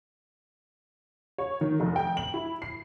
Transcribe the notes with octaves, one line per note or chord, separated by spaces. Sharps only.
C#5
D#3
F1
G5
F#7
E4
C7